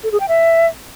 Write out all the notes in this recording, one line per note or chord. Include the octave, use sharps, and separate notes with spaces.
A4
G#4
G5
E5